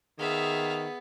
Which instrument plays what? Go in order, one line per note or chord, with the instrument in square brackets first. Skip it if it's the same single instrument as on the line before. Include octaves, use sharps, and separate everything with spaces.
[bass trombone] D#3 [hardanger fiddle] B3 [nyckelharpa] G#4 [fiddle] E5 F5